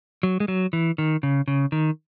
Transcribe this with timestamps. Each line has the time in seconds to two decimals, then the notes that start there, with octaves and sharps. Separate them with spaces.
0.23 F#3
0.40 G#3
0.48 F#3
0.73 E3
0.98 D#3
1.23 C#3
1.48 C#3
1.72 D#3